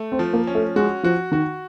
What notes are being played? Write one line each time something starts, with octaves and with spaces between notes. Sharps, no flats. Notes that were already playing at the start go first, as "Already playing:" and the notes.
Already playing: A3
C4
F3
A#3
C#4
A3
G#3 F#4
F3 F#4
D#3 F#4